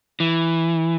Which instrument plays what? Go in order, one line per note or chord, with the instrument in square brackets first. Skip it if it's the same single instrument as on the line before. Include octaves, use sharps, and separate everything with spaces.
[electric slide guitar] E3